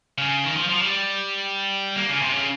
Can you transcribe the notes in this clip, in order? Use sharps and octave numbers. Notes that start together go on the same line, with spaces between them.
C#3
D#3
F3
F3
G3
A#3
C#3
C3
C#3